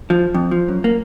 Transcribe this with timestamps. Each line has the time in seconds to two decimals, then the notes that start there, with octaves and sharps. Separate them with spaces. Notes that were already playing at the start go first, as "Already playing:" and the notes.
0.10 F3
0.34 F2
0.51 F3
0.68 F#2
0.84 A#3